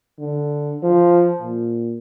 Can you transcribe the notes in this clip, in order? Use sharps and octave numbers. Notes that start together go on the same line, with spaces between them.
D3
F3
A#2